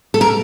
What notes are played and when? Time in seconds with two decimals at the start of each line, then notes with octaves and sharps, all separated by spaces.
0.14 A4
0.21 A#4